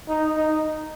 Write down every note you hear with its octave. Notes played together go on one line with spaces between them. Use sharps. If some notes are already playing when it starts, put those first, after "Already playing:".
D#4
D#4